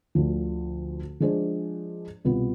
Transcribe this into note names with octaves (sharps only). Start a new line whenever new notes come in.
D2 D3 F3
F3 G#3 D4 G#4 C5
C2 B2 B3 F4